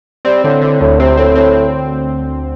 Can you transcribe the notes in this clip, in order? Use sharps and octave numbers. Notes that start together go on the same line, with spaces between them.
G3 C4
A2 D3
A2 D3
D2 A2
C3 C4
A2 C4
A2 C4